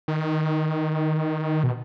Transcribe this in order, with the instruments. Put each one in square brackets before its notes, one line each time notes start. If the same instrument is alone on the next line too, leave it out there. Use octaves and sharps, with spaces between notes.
[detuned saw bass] D#3
B2